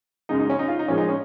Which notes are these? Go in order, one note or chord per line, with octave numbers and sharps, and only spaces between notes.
F#2 C#3 G#3 D#4
D#4
C#4
D#4
F4
D#4
A#2 F3 G#3 C#4
D#4
C#4